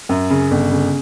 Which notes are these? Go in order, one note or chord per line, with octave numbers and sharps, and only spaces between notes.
F#2
C#3
G1
C#3